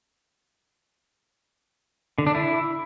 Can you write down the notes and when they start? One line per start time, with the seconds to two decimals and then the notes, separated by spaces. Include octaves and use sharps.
2.18 D3
2.27 D4
2.35 E4